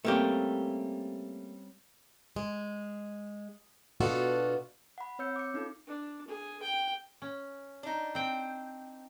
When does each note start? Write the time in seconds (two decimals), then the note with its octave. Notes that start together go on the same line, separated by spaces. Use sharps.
0.05 G3 A3 A#3 C4 C#4 G4
2.36 G#3
4.00 B2 B3 D4 F4 F#4 A4
4.98 F#5 B5
5.19 C4 C#5 E6 G6 C#7
5.36 D6 C#7
5.54 C#4 D#4 F4 A4
5.87 D4
6.27 G#4
6.62 G5
7.22 C#4
7.83 D4 D#4
8.15 C4 G5